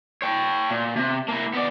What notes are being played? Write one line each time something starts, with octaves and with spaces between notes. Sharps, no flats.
C#5 G5
A#2
C3
A#3 E4
B3 D5